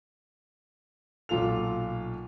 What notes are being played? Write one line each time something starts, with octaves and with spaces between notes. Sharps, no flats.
B1 A#2 F4 A4 F7